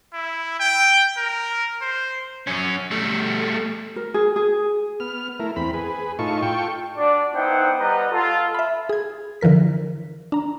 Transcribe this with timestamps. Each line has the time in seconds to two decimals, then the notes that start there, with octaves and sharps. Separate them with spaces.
0.13 E4
0.60 G5
1.17 A#4
1.82 C5
2.47 F#2 C#4
2.91 G3 A3
3.96 A#4
4.14 G#4
4.36 G#4
5.00 B3 F6
5.40 A3 E4 A#4
5.56 E2 C4 B5
5.74 G#4 B4
6.19 A2 D#4 F4 A4 C#6
6.42 F4 A4 G5 C#6
6.97 D4 F#4 D5
7.34 B3 D#4 E4 C5 F#5 G5
7.79 G3 B4 D#5 F#5 A#5
8.12 F4 A4
8.54 E5 B5
8.89 G#4 G#6
9.41 D3 E3 F3 A#4 B6
10.32 D4 A#5